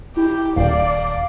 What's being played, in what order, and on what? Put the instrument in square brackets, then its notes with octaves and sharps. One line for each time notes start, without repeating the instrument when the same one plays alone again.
[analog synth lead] E4 [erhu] G4
[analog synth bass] D#1 [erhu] D5 [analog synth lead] F5